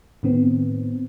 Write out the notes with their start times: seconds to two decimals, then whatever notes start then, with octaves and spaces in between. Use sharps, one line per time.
0.23 A2 D#3 B3 C4